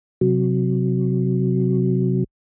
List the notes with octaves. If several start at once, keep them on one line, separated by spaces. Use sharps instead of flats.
C3 F#3